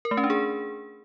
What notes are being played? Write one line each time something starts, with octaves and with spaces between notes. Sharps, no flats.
A#4
A3
C#4
D4
G#4